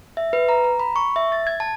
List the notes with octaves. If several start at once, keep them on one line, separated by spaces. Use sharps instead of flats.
E5
B4
A#5
A#5
B5
C#6
E5
A6
G#6
A5